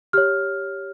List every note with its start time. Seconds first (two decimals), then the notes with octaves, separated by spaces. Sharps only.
0.13 G4 C#5 F6